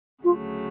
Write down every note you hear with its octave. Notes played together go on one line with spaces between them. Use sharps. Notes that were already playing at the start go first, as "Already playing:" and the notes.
D2 C#3 F#3 A3 F4